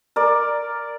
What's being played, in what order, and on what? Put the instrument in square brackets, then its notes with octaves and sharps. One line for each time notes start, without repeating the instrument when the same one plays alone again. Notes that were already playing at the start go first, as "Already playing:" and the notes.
[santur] A#4 D5